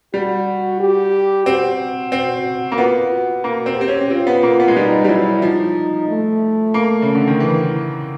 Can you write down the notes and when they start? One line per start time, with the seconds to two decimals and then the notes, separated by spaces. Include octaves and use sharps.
0.13 G3 F#4
0.80 G4
1.46 C4 F#4
2.12 C4
2.72 A#3
2.77 B3 F4
3.11 F#4
3.44 A#3 F#4
3.66 C4
3.77 C4 G4
3.88 C#4
4.10 C4 F4
4.27 B3
4.43 A#3
4.60 B3
4.68 G#3
4.76 G3 D#4
5.04 G3
5.09 F#3 E4
5.42 F3 D#4
6.08 A3
6.74 A#3
7.02 C#3
7.15 D3
7.27 D#3
7.40 E3